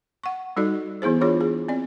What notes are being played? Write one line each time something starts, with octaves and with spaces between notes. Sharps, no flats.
F#5 C#6
G3 D#4 F#4 A4 D5
E3 B3 E4 G#4 C5
E3 D4 F4 G#4 C#5
G#4
C4 D5